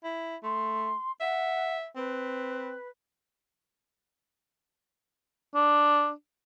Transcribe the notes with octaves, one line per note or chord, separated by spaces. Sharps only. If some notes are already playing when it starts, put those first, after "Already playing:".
E4
A3 C6
E5 F#5
C4 B4
D4